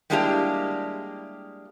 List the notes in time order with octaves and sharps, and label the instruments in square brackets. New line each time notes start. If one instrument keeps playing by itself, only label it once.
[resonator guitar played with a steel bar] G3 G#3 A#3 D4 E4 G4